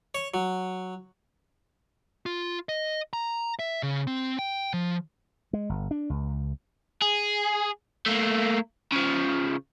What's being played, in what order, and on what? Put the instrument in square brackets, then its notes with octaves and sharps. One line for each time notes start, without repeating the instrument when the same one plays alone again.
[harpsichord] C#5
F#3
[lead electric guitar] F4
D#5
A#5
E5
C#3
C4
G5
F3
[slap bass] G#3
G1
D4
C#2
[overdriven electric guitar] G#4
A3 A#3
C#3 F3